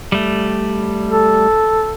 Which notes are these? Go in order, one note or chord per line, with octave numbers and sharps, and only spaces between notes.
G3 A3
A4